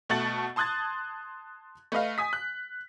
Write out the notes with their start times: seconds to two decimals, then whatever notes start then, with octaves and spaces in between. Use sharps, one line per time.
0.10 B2 A3 F#5 A5 A6 F#7
0.56 A5 C6 D#6 F#6 G#6 A6
1.92 A3 B4 D#5 F5
2.18 G#5 D#6 B6
2.33 F#6